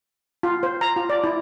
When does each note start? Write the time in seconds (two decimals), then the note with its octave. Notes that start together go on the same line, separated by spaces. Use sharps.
0.43 F4
0.63 C5
0.81 A#5
0.97 F4
1.10 D5
1.24 E4